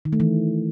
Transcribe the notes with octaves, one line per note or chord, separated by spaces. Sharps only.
D#3
A3
E3